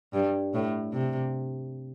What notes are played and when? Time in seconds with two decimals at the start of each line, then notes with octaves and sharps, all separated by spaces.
0.13 G2
0.54 A2
0.93 C3